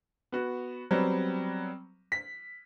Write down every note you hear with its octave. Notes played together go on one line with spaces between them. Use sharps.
B3 F#4
F#3 G3 B3 C4
B6